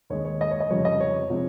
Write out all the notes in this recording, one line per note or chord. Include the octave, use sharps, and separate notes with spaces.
D#2 D#3 G#3 C#5
C#5
D#5
C#5
D#5
F1 F2 C#3 G3 C#5
D#5
C#5
C3 F3 G#3